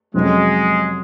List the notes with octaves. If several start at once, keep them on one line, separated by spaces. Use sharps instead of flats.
F2 C3 F#3 G#3 C#4